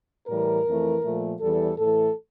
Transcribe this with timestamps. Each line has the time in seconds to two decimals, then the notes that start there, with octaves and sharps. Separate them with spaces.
0.28 A2 E3 G3 A#4
0.66 F2 E3 A3
1.03 A#2 F3 A3
1.41 E2 E3 G3 A4
1.79 A2 E3 A3 A4